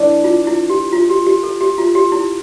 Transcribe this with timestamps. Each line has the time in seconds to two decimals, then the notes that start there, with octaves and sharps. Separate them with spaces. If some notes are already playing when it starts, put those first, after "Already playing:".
Already playing: E3 A3 D4
0.24 F4
0.47 E4
0.70 G4
0.93 F4
1.10 G4
1.27 G4
1.43 A4
1.61 G4
1.78 F4
1.95 G4
2.12 E4